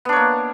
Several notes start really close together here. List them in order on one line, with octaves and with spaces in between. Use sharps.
B3 D4 C#5 A#3